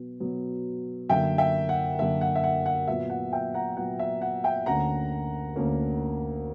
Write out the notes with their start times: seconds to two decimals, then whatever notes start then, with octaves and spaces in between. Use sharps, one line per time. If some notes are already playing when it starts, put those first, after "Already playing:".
Already playing: B2 F#3 B3
0.20 B2 F#3 B3
1.09 F#2 D3 A#3 E5 G5
1.38 E5 G5
1.69 F#5
1.99 F#2 D3 A#3 E5
2.21 F#5
2.36 E5
2.44 F#5
2.66 F#5
2.87 A#2 F#3 B3 E5
3.10 F#5
3.33 E5 G5
3.54 F#5 A#5
3.77 A#2 F#3 B3 F#5
3.99 E5
4.22 F#5
4.44 E5 G5
4.66 D2 D3 A#3 C#4 F#5 A#5
5.55 D2 D3 A#3 C#4